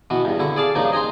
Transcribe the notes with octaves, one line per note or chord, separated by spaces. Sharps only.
B2 E3 F#4
E2 G2
D3 E4 C#6
G#4 D5 F5 A5
G2 C#3 F3 A#3 D#4
D#5 G#5 A#5 C6